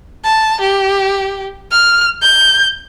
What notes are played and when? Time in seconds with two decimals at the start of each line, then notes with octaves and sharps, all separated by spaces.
0.24 A5
0.60 G4
1.71 F6
2.22 G6